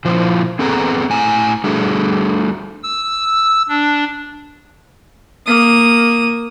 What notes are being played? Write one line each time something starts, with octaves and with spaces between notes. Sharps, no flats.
A#2 F3 E4 C5
B3 C4 G#4 A4 B4 A#5
A2 G#5 A#5
G3 A3 D4 F#4 G#4
E6
D4
A#3 D#6